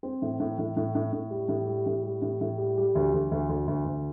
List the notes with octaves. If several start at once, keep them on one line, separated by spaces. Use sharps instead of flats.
C4
A2
A2
A2
A2
A2
A2
G3
A2
G3
A2
G3
A2
A2
G3
G3
D2
D2
D2
D2
D2
D2